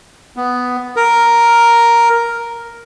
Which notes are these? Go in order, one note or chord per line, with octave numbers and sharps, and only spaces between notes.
B3
A#4